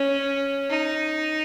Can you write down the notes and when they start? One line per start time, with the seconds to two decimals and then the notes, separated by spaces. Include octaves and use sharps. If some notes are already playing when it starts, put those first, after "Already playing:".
Already playing: C#4
0.70 D#4